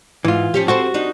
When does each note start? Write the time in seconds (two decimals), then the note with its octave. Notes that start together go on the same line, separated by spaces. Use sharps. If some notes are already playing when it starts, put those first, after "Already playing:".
0.25 G#2 E3 F4
0.54 F3 C#4 G4
0.68 C4 F#4 A4 C5
0.94 D4 D#4